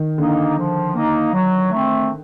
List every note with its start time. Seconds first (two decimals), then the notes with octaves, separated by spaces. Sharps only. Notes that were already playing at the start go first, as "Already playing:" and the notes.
Already playing: D#3
0.18 D3 A#3 D#4
0.57 F3
0.95 A#3 D#4
1.33 F#3
1.71 A3 C4